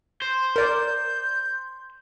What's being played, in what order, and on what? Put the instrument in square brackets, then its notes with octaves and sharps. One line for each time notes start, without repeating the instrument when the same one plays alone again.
[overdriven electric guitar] C5
[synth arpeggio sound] A#4 D5 [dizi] G6